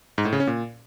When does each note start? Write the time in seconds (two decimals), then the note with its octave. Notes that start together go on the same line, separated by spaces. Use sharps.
0.18 G#2
0.25 A2
0.33 C#3
0.40 C#4
0.47 A#2